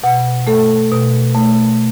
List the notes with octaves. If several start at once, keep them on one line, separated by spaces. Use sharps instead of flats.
B2 F#5
A3 A4
B2
A3